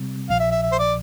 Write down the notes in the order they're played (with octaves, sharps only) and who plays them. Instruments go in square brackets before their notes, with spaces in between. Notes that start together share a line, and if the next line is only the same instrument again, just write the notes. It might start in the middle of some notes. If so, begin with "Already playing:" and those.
Already playing: [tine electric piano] C3 G3 C4
[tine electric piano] A#1 A#2 F3 [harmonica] F5
[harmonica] E5
E5
E5
C5
D5